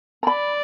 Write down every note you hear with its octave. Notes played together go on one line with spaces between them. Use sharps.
A#5
D5 B5